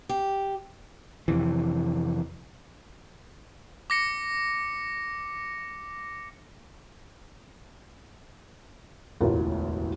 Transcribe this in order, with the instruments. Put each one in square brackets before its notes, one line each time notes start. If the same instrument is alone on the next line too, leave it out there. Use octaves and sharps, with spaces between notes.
[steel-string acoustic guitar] G4
[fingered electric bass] F2 C3 E3
[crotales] D6 A#6 C#7
[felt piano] E1 A1 D2 A2 F4 A#4